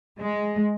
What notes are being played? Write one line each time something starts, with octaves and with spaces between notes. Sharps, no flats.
G#3